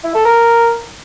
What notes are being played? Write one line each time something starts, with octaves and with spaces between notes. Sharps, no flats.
E4
A4
A#4